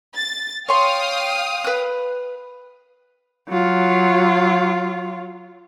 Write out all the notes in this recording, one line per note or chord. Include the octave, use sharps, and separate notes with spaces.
A6
C#5 F5 G5 C6 D#6
B4 F#6
F#3 F4